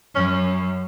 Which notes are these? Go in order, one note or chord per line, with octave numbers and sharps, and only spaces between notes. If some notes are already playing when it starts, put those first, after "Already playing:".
F#2 C#4